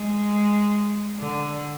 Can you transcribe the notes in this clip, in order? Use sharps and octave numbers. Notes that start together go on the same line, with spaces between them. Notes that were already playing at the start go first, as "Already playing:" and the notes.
Already playing: G#3
D3